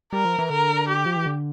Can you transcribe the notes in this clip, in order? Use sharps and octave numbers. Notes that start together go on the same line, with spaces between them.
G3 A#4
F3
E3
D3 A#4
G4
F3
E3
D3